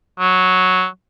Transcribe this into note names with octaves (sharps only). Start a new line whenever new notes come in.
F#3